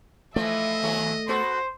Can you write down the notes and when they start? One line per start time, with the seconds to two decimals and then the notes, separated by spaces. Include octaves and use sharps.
0.36 E3 F3 A3 D#5 E5
0.83 D#2 F#3 A4
1.28 B3 F#4 A4 C5